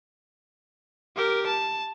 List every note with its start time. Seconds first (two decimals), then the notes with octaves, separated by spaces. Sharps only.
1.16 G4 A#4
1.47 A5